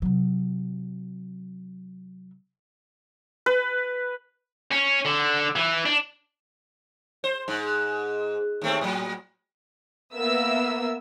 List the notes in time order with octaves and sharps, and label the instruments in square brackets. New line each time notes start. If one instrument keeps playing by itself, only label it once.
[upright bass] C3 F#3
[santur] B4
[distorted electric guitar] C#4
D3
E3
D4
[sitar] C5
G#2
D#2 A3 C4
A2 F#3
[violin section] A#3 B3 A#4 E5 E6